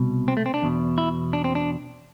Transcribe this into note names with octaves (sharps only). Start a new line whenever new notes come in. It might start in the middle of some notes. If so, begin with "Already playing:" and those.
Already playing: C2 B2
C4
A3
C4
D4
E2 B2
E4
D4
C4
D4